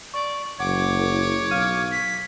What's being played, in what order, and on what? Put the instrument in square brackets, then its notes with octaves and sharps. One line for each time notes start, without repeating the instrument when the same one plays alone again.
[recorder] D5 [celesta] C#6
[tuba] F#1 [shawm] C#5 [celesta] F#5 [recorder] D6
[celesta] E4 G#4 A#4
[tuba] B1 [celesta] F5 F6 D#7
[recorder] B6